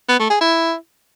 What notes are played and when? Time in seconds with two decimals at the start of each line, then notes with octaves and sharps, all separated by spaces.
0.09 B3
0.20 A3
0.30 G#4
0.41 E4